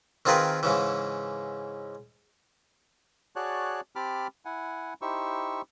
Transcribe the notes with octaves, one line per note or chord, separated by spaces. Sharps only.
D#3 C4 F4 G#4 A#4 B4
G#2 C#3 E3
F#4 G#4 C#5 D5 A5 F#6
C4 G4 A5 B5 D6 F6
E4 F#5 G#5
D#4 E4 G4 C5 C#6 E6